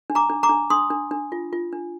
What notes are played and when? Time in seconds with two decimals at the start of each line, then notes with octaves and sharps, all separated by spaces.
0.10 D4
0.15 A#5 D6
0.30 D4
0.43 A#5 D6
0.49 D4
0.70 D4 C6 D#6
0.90 D4
1.11 D4
1.32 F4
1.53 F4
1.73 D4